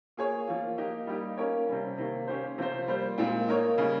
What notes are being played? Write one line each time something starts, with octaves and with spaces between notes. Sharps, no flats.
A#3 F4 G#4 C#5
F3 A#3 F4
A#3 D#4 G4
G3 A#3 D#4 G4
A#3 C#4 F4 A#4 C#5
C3 G3 C#4
C3 D#3 A#3
A#3 C#4 G4 C5
C3 F3 C4 F4 C5
G3 A#3 F4 C5
A#2 G#3 C4 F4
A#3 D#4 A#4 C#5
C#3 G3 A#3